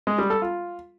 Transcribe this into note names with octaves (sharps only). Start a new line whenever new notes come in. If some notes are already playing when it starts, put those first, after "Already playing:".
G#3
G3
A4
F4